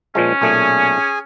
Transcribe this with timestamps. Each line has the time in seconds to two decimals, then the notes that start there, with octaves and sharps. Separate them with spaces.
0.15 A#2 F3 G#3 C#4
0.41 B1 A#2 A3 G#4 G#5